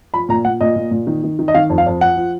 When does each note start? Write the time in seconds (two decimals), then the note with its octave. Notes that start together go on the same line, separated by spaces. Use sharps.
0.14 F3 B5
0.29 A#2 A#5
0.45 A#2 F#5
0.61 A#2 D#5
0.76 A#2
0.91 A#2
1.07 D#3
1.24 D#3
1.39 D#3
1.48 D#5
1.54 D#3 F5
1.70 F2
1.78 F5
1.86 F2
2.01 F3 F#5
2.17 F3